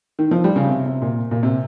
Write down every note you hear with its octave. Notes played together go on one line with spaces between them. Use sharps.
D#3
F3
G3
C#3
C3
C3
A#2
A#2
C3